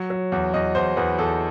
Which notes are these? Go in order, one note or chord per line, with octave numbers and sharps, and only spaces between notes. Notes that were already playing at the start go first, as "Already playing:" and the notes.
Already playing: F#3
F#3
E2
E2 D#5
E2 C5
E2 B4
E2 A4